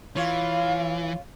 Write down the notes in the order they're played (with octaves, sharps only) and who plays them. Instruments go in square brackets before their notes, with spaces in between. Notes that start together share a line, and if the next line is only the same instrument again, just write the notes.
[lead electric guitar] E3 [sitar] F4 C#5 [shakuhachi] F5